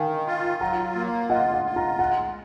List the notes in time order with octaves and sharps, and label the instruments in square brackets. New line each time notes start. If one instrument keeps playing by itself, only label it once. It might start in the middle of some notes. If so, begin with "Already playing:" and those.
Already playing: [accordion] D#3 [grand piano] F5 G#5
[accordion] F4
[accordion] F#3 [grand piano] F#5 A#5
[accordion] A#3
[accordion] F4 [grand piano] D#5 F#5
[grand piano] D#5 F#5
[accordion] F4
[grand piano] F#5 A#5
[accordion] G#3 [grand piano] F#5 A#5